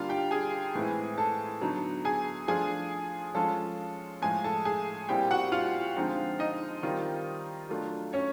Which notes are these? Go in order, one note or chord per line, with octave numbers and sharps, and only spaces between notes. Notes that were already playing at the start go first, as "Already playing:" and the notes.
Already playing: D3 G3 A#3 F4 F5
G4 G5
G#4 G#5
A2 E3 G#3 C4 E4
A4 A5
D3 F#3 B3 D#4
G#4 G#5
F3 A3 D4 F4 G#4 G#5
F3 G#3 C#4 F4 A4 A5
A2 F3 G#3 G#4 G#5
A4 A5
G#4 G#5
A#2 G3 C4 E4 G4 G5
F#4 F#5
F4 F5
D3 F3 G#3 C4 D#4
D#4 D#5
D#3 G3 C4 F4
F#3 A3 D4 F4
C#4 C#5